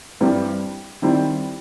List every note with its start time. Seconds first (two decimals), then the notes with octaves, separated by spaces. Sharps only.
0.20 G2 E3 G3 C4
1.02 D#3 G3 C4 E4